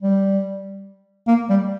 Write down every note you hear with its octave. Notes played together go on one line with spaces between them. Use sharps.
G3
A#3
G3